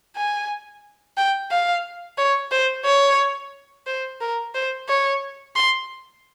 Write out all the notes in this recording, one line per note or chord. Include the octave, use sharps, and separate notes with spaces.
G#5
G5
F5
C#5
C5
C#5
C5
A#4
C5
C#5
C6